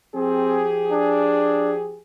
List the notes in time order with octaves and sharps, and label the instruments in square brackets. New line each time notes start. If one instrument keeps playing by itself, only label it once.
[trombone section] F3 G4 G#4 [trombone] C4
[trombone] D4